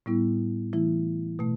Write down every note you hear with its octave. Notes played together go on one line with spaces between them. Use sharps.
A2 G3 B3 E4
E3 A3 E4
B2 A3